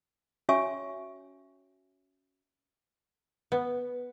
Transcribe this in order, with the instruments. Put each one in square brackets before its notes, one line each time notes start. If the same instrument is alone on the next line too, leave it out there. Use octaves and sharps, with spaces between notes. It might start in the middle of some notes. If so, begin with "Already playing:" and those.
[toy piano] C#4 F#4 C#5 E5 G#5 C#6
[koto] B3